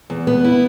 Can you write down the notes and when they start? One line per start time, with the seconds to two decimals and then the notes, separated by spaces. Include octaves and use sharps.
0.10 E2
0.27 B3
0.44 E4